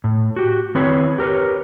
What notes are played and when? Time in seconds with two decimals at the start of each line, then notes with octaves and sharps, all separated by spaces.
0.04 A2
0.36 F#4 G4
0.75 D#3 C4 E4 G#4 B4 C#5
1.18 G4 A#4 B4 C#5